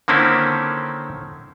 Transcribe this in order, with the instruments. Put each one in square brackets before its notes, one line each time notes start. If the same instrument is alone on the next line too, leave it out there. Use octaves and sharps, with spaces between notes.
[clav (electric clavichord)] D3 D#3 A#3 C4 C#4 E4